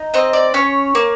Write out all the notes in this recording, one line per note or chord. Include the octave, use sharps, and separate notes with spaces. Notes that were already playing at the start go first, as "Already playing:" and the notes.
Already playing: D#4
C4 D#5
D5
C#4 C#5
A#3